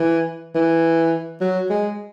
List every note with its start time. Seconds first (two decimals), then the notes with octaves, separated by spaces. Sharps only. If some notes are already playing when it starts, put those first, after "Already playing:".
Already playing: E3
0.55 E3
1.41 F#3
1.70 G#3